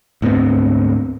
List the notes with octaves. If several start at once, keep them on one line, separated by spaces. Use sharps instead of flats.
D2 G#2 B3 C4